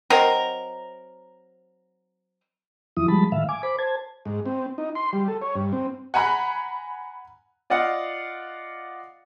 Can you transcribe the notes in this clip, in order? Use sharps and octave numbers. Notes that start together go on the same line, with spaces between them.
F#3 C4 D#4 A#4
E2 E3 F3 E4 D#6
F3 G3 G#3 A5 B5
A2 D#3 E5 F5
G#5 D6
C5 B5 D6
C5 A5 G#6
G#2
C4
D#4
C6
G3
A4
C#5
G2
C4
F#5 G#5 A#5 B5 F#6
F4 D5 D#5 F5 F#5